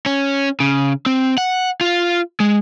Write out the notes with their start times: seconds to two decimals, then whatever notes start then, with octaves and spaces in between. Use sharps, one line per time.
0.06 C#4
0.60 C#3
1.06 C4
1.38 F#5
1.81 F4
2.40 G#3